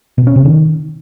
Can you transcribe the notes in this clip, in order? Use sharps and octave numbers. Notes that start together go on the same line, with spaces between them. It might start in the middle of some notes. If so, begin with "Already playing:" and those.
B2
C#4
C3
D#3